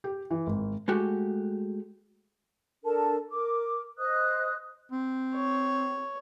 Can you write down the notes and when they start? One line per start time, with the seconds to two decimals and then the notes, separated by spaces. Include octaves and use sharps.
0.04 G4
0.31 E3
0.47 G#1
0.88 G#3 A3 F#4 G4
2.85 D4 A4 A#4 A5
3.30 A#4 D6
3.98 C5 D#5 D#6 F#6
4.92 C4
5.35 C#5